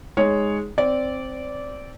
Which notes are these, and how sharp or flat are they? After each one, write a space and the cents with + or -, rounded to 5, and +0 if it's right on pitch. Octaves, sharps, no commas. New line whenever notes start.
G#3 -5 D#4 +0 C#5 +0
C4 +0 D5 -20